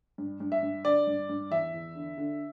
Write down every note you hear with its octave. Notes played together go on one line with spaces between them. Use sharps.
G2
G2
E5
G2
D3 D5
G2
G2
E2 E5
E2
D3
D3